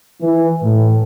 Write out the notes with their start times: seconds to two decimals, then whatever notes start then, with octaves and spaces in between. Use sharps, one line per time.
0.22 E3
0.63 A2